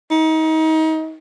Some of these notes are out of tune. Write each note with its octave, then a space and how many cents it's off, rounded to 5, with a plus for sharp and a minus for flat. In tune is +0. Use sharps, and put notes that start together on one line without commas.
D#4 +30